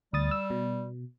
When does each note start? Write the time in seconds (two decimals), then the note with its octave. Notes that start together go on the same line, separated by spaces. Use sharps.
0.13 D2 G3 D#6 A6
0.31 E6
0.50 B2